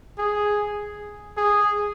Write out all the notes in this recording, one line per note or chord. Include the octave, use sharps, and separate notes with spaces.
G#4
G#4